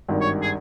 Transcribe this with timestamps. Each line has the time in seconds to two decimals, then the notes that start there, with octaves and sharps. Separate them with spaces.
0.09 G#1 G2 D#3
0.21 C#5
0.42 G#4